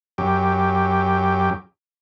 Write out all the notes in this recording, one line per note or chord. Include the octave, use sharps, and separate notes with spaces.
F#2 G4